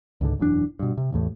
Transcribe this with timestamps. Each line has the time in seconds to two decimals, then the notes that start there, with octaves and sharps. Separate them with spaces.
0.21 C#2 G#2 D3
0.39 E1 F#2 E3 D4
0.79 G2 B2
0.97 C3
1.12 A1 E2 A2